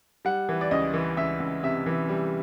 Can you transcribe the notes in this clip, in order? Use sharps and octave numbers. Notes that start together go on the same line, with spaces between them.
G3 F#5
E3
D5
C#2 D#5
E3
C#2 E5
C#2
C3 E5
E3
G3